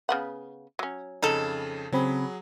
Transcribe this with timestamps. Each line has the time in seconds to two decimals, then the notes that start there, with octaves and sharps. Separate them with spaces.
0.09 C#3 B3 F#5
0.79 F#3 C#4
1.22 F2 C#3 D#4 A4
1.92 C#3 F#3 C4 G#4 B5